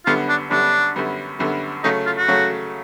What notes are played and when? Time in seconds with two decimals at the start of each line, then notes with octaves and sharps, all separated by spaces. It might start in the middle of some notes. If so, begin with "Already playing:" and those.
0.06 F#2 D3 G3 B3 F4
0.29 D4
0.51 F#2 D3 G3 B3 D4
0.96 F#2 D3 G3 B3
1.39 F#2 D3 G3 B3
1.84 C#3 F#3 A3 D#4
2.06 F4
2.18 F#4
2.28 C#3 F#3 A3